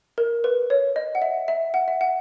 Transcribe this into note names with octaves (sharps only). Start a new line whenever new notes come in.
A#4
B4
C#5
D#5
F#5
E5
E5
F#5
E5
F#5